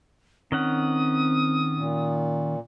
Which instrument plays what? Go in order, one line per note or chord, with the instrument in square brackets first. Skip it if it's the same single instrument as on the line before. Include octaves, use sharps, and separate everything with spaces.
[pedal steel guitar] D#3 C#4 F#5 [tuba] C4 [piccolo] D#6
[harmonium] A#2